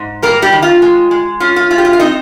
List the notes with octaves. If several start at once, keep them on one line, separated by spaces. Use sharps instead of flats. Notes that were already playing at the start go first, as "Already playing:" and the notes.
Already playing: G#2
G3 A#3 A#4
G3 G4
D#3
F4
G#3
G#3
C#4 F4
F4
G#3 F4
G4
F4
F5
C4 D#4 D#5